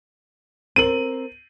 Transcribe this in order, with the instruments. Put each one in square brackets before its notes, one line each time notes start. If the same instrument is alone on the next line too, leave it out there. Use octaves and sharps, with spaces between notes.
[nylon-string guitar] C4 A#4 [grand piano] D#7 F#7